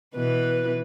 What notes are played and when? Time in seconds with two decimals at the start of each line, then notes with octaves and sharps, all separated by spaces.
0.15 B2 E3 B4